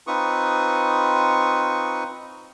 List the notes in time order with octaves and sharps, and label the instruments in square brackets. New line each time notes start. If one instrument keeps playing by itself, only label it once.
[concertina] C4 D#4 F4 B4 C#6 D#6